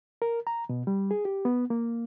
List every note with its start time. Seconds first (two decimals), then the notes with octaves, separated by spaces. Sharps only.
0.22 A#4
0.47 A#5
0.69 B2
0.87 G3
1.11 G#4
1.25 G4
1.45 B3
1.70 A#3